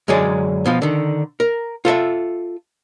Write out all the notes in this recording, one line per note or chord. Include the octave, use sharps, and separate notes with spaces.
F#2 D3 F#3 G#3 G#4 D5
B2 F3 F4
D3 D#3
A#4
F4 A4 C5 E5